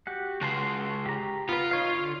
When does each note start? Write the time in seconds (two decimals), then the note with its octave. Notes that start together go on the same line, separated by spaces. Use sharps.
0.07 F#4 G4 F#5
0.41 C#3 G#3 F#4 A5 C6
1.06 G4 A#5
1.49 B3 F4 B4
1.71 D#4 C#5 F5
1.95 D3